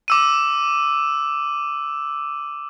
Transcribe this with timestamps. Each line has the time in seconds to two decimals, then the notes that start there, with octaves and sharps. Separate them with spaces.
0.08 D6 E6 D#7